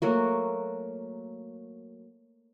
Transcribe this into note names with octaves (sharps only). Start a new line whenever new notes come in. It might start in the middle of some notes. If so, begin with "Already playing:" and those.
F#3 A3 A#3 F#4